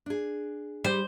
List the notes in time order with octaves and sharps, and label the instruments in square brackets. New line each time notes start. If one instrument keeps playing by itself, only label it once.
[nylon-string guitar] D4 G#4
[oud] G3 [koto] C5